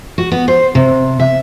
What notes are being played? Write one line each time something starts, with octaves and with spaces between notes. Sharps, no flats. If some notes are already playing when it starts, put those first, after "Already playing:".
F#4
B3
C5
C3
E5